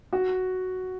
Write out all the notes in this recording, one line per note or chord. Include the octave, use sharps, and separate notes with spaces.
F#4